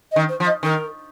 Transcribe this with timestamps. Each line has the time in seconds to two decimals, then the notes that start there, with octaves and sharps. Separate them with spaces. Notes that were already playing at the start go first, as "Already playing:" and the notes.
0.11 D#5
0.16 D#3
0.28 C5
0.40 F3
0.46 D#5
0.63 D#3 A#4